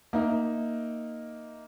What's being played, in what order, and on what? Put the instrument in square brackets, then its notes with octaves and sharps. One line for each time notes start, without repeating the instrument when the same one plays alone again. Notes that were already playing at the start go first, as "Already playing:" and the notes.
[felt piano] A#3 D#4 E5